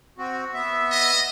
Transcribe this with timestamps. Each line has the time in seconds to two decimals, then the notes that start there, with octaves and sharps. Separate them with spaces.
0.18 C4 F#4
0.54 B3 E5
0.92 D#5